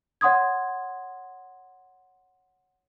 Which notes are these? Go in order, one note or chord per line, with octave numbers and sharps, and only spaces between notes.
C#5 F#5 C6 D#6 G#6